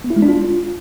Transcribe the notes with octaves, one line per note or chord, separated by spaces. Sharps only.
B3
E4
G#3
D4
F4